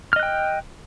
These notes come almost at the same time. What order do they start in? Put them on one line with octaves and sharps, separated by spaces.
F6 D#5 F#6 G5